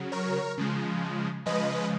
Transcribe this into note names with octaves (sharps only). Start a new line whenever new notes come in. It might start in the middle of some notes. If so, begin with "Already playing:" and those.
Already playing: C#3 F#3
A#4 C#5
C#3 F3 G#3
C#3 F3 G#3 B4 D#5